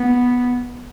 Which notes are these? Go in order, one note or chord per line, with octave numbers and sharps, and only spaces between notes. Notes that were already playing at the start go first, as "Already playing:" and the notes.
Already playing: B3